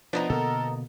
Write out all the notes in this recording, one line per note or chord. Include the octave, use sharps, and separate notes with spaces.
F3 B3 D4 D#4 B4 A#5
B2 D3 A#3 A4 A#4